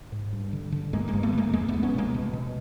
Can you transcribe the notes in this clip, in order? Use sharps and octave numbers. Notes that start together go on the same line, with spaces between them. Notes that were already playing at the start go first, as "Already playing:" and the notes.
G#2
G2
D3
D3
G2 G#3 A#3
G#3 A#3
G2
A3 B3
D3
G#3 A#3
E2 G#3 A#3
A3 B3
E2
B3 C#4
B2 G#3 A#3
B2
B2